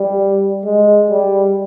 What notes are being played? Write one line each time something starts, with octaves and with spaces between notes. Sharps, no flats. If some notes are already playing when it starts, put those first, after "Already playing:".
Already playing: G3
G#3
G3